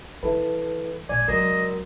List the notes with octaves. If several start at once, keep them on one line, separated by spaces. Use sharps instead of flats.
E3 E4 A4 B4
A#1 D5 G#5
C#2 F#3 F#4 A#4 D#5